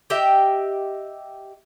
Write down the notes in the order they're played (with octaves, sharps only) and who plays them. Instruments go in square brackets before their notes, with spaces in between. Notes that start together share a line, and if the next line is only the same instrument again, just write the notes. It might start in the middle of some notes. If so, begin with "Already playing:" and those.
[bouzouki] G4 D#5 E5 G5